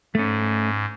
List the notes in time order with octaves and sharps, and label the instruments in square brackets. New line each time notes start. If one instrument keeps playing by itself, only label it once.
[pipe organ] G#2 [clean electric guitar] A3 C#4